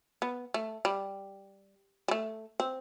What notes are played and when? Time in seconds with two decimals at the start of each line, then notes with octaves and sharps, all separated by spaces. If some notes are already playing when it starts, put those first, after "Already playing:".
0.22 B3
0.54 A3
0.85 G3
2.08 G3
2.11 A3
2.60 C4